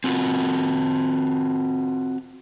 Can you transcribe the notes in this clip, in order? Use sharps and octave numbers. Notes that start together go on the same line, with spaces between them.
C4 F4 F#4